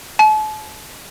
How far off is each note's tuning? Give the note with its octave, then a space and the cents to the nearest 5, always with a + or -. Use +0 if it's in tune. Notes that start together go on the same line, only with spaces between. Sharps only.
A5 -40